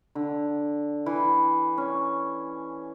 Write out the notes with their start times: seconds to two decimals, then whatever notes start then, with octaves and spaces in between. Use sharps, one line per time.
0.15 D3
1.06 E3
1.78 C#4